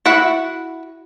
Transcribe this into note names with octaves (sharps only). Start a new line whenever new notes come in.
E4 F#4 E5 F#5